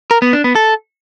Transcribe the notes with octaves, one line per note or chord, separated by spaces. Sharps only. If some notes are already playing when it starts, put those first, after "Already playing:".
A#4
B3
D4
B3
A4